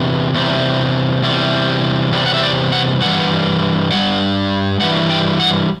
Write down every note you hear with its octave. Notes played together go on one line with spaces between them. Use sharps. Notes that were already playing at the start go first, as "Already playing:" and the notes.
Already playing: E2 C3
E2 C3 G3
E2 C3 G3
E2 C3 G3
F#5
E5
D5
F#5
G2 E3 G3 F#5
G2 E3 G3 F#5
G2 E3 G3 F#5
G5
F#5